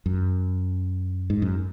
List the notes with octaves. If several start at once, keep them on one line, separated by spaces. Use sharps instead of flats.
F#2
G#2
F#2